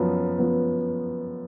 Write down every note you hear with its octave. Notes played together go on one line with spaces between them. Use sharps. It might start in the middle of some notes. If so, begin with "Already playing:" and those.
Already playing: F#2 F3 B3
F3 B3